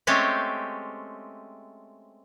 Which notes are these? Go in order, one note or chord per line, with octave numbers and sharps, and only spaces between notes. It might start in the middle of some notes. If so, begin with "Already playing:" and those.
G#3 A3 C4 C#4 G4